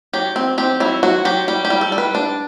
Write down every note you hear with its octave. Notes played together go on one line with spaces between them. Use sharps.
F#3 G4
C4
C4 G4
F#3 E4
F#3 F#4
F#3 G4
G3 G4
G4
G3
A4
G3
B4
D4